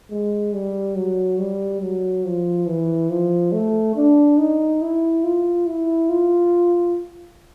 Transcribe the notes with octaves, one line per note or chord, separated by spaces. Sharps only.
G#3
G3
F#3
G3
F#3
F3
E3
F3
A3
D4
D#4
E4
F4
E4
F4